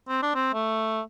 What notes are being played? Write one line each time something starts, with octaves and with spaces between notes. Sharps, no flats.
C4
D4
C4
A3